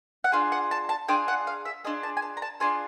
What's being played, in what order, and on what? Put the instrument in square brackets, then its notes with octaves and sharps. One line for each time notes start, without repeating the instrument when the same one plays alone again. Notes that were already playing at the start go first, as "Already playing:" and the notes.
[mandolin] F#5
D4 F4 G#4 F5
F#5
A5
A5
D4 F4 G#4 G5
F#5
F5
E5
D4 F4 G#4 D#5
A5
G#5
A5
A#5
A5
D4 F4 G#4 G#5